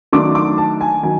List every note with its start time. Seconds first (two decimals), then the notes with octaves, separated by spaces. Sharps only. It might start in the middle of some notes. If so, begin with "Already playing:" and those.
0.12 D#3 F#3 A3 D4 D6
0.35 D6
0.58 A5
0.81 G#5
1.03 D#3 F#3 G#5